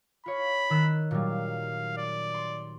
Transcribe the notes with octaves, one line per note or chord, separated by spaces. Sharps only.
F4 C#5 B5
D#3 E6 F#6
A#2 F#3 G3 F5
D5
C6